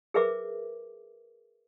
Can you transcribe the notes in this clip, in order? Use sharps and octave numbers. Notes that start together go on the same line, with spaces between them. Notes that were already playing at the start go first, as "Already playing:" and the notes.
G#4 A#4 B4 E5 D6